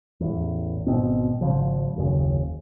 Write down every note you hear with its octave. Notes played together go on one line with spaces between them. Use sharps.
A1 E2
G#1 B2 C4
G#1 C#3 F3
F#1 D#2 C#3